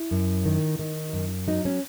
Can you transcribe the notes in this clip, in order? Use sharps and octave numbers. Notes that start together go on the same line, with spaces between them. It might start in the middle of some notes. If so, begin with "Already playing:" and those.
Already playing: E4
F#2
D#3
D#3
F#2
F#3 D#4
C#4